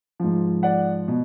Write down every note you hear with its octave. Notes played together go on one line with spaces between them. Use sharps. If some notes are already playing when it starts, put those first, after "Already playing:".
G#2 F3
D5 F#5
B2